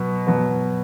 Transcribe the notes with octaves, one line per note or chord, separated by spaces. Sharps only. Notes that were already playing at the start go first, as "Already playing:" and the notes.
Already playing: B2 F#3 B3
B2 F#3 B3